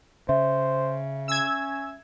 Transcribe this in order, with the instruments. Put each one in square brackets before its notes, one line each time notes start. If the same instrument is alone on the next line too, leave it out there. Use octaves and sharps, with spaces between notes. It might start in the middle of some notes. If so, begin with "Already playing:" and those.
[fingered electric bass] C#3 [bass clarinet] C5 [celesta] E5
[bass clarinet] C#4 [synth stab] E6 G#6